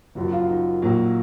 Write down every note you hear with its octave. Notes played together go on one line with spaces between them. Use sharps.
F#1 F#2 F3 F#4
F4
D#4
A#1 A#2 F#3 A#3